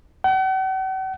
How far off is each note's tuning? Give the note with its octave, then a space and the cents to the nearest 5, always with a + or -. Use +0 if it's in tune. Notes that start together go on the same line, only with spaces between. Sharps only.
F#5 +45